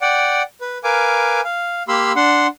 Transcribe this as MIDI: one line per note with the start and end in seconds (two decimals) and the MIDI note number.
0.01 0.42 74
0.01 0.42 78
0.01 0.42 79
0.61 0.78 71
0.84 1.41 70
0.84 1.41 71
0.84 1.41 77
0.84 1.41 80
0.84 1.41 86
1.44 1.83 77
1.88 2.12 58
1.88 2.12 67
1.88 2.12 77
1.88 2.12 83
1.88 2.12 84
1.88 2.12 88
2.16 2.47 62
2.16 2.47 78
2.16 2.47 84